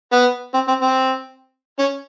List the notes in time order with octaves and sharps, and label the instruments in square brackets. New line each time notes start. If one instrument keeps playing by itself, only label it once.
[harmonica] B3
C4
C4
C4
C#4